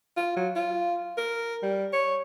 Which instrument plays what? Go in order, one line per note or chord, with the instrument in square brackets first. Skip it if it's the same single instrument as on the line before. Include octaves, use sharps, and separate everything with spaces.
[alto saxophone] F4
F#3
F4
A#4
G3
C#5